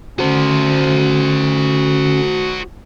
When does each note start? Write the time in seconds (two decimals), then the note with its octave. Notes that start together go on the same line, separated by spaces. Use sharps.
0.19 D3 C#4 F#4 C5